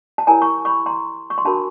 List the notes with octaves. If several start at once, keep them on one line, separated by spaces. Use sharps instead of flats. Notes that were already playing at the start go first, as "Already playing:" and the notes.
A5
E4 G4 A#4 C#5 G#5 A#5
C#6
B5 C#6
A#5 C6
C#6
C6
D4 F#4 A#4 A5 B5